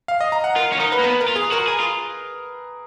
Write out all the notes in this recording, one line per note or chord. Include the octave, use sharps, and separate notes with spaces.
F5
D#5
A#5
F#5
F4 A#4
C#4
D#4 A#4
B4
A#3
B3 B4
A#4
F4
G#4
F#4 A#4
G#4 A#4
F4